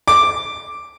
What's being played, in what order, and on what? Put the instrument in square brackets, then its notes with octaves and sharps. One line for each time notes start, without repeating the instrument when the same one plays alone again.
[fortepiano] D6